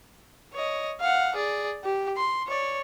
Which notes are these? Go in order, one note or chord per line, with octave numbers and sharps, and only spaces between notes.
C#5 D#5
F5 F#5
G#4 D5
G4
C6
C#5 D5